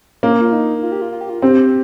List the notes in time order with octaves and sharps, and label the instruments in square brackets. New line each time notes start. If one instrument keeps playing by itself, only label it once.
[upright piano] A#3 [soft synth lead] C#4
[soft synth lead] F4
D#4
F4
G4
F4
F4
G4
F4
[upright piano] C4 [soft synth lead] G4